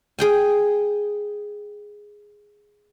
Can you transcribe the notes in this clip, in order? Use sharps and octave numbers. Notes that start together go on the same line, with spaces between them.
G#4 G5 G#5